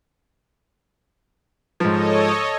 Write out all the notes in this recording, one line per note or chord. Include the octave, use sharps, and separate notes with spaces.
G#2 F3 A4 C#5 D#5